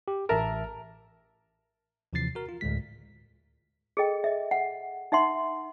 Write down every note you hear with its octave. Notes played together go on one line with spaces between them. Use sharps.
G4
A1 A#4 E5 A5
D#2 C3 E3 F3 A6 C7
F#4 A#4
F4
D2 A2 G#3 B6
G#4 A4 D#5 G5
D#5 E5
F#5
D#4 E5 F#5 C6